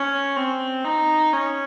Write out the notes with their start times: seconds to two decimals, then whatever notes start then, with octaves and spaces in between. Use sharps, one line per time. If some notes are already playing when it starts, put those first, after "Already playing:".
Already playing: C#4
0.37 C4
0.85 D#4
1.33 C#4